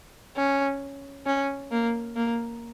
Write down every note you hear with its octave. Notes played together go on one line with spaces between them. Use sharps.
C#4
C#4
A#3
A#3